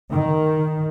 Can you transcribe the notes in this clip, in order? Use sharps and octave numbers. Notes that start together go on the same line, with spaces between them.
D#3